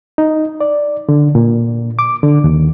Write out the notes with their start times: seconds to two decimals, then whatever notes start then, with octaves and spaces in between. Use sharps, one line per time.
0.18 D#4
0.61 D5
1.09 D3
1.35 A#2
1.99 D6
2.23 D3
2.44 D#2